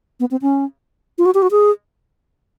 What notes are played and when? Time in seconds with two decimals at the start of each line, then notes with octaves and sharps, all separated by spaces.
0.20 B3
0.31 C4
0.42 C#4
1.18 F4
1.26 F#4
1.34 G4
1.42 F#4
1.51 G#4